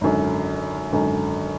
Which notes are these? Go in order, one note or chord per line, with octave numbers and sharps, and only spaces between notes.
G#1 F#2 D3
G#1 F#2 D3